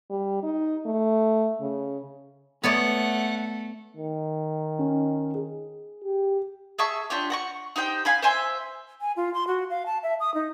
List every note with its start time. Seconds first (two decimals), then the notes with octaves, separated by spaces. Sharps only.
0.10 G3
0.43 D#4
0.86 A3
1.61 C#3
2.64 A3 B3 C#5 D5 F#5
3.97 D#3
4.79 C#4
5.34 G#4
6.04 G4
6.79 G#4 E5 A5 C#6
7.10 D4 F4 G4 C#5
7.30 F#5 A#5 C#6
7.76 D#4 G4 C5 G5
8.05 F5 G#5 B5
8.22 C5 E5 G#5 C6
9.01 G#5
9.17 F4
9.34 C6
9.47 F#4
9.70 F5
9.86 A5
10.03 E5
10.20 D#6
10.34 D#4